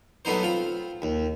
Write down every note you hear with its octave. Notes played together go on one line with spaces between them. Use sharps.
F#3 A3 B3 D#4 C5
C4 F4
D#2